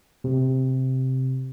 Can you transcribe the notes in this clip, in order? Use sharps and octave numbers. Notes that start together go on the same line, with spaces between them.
C3